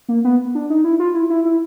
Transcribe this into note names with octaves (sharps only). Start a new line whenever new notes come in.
A#3
B3
D4
D#4
E4
F4
E4
E4
E4